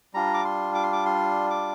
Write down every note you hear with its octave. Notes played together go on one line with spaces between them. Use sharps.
G3 D4 F4 A#5
D6
C6
D6
C6
D6
C6
D6